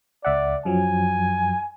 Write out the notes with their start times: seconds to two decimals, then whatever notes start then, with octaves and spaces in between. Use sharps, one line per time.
0.25 C#2 D5 E5 F#5
0.65 F#2 F3 F#3 G#5